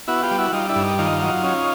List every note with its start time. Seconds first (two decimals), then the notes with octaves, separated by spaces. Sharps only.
0.08 B3 E4 F#4
0.23 F4 G4
0.31 G3
0.38 E4 F#4
0.53 G3 D#4 F4
0.69 D4 E4
0.76 G2
0.83 D#4
0.98 D#3 D#4 F4
1.22 F#3
1.44 C#4